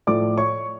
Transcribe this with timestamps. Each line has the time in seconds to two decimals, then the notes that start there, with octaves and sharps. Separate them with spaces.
0.07 A2 F3 A3 D5 D6
0.37 C#5 C#6